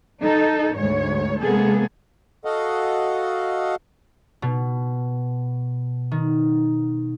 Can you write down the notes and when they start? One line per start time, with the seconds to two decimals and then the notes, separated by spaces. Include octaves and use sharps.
0.21 D#4 A4
0.75 D2 G#2 C#5
1.40 C3 G#3 A#3 B3 G#4 A4
2.45 F#4 A4 D#5 F5 F#5
4.42 B2
6.11 D#3